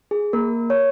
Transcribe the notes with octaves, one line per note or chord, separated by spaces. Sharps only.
G#4
A#3 A#4
C#5